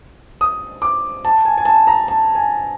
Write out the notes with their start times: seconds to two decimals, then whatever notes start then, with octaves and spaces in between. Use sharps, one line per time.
0.41 D#6
0.82 D6
1.25 A5
1.45 G#5
1.58 G#5
1.65 A5
1.87 A#5
2.08 A5
2.35 G#5